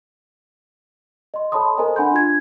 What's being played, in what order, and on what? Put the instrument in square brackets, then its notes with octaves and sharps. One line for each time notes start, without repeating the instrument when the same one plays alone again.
[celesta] D#5 C6
A4 C#5 A5 B5 C6 D#6
A4 A#4 C5 D#5 G#5 A#5
D4 F#5 G#5 B5 C6 G6
D4 F4 G#6